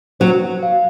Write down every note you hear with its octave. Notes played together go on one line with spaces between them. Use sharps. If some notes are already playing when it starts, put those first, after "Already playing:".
F#3 C5
F5